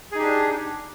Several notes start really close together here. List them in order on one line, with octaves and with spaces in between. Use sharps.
G#4 D#4 G4 D4